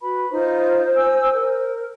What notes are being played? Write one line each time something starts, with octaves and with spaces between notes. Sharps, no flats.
F#4 B4 B5
D#4 F4 C5
G#5 E6
A#4